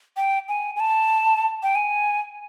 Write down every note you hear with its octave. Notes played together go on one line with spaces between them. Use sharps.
G5
G#5
G#5
A5
G5
G#5